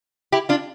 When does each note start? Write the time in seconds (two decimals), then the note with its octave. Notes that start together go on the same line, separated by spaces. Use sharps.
0.32 E4 G4
0.49 D4 F4